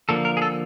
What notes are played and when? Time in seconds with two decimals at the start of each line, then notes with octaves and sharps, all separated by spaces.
0.09 D3 F3 A#3 A4
0.25 A#4
0.37 G#4
0.42 A4